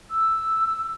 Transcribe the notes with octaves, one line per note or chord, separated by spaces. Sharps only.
E6